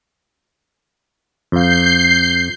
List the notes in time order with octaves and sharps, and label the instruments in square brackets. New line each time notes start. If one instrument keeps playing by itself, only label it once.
[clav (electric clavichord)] F2 F5 [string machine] G6 C7